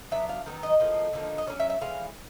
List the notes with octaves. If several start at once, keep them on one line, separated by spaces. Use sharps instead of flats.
F#3 B3 D4 E5
F5
D#3 F#3 B3 D#4
D#5
A2 F3 A#3
D3 F3 A#3 D#4
D#5
F#3 A#3 C#4 D5
E5
E5
E3 G#3 C#4 F5